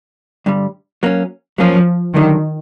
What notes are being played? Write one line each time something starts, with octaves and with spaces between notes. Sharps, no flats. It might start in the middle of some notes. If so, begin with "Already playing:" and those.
G2 D3 G3
F#3 A#3 C#4
F3 F#3 A#3 C#4
G2 D3 D#3 F#3